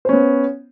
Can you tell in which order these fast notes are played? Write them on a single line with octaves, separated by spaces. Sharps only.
C5 C#4 B3